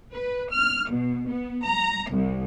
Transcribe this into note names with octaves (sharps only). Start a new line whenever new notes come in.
B4
F6
B2
B3
A#5
C2